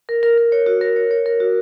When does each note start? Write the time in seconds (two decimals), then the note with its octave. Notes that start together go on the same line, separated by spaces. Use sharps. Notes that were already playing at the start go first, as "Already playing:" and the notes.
0.09 A#4
0.23 A#4
0.38 A#4
0.52 C#5
0.66 F#4
0.81 A#4
0.96 C#5
1.11 C#5
1.26 A#4
1.40 F#4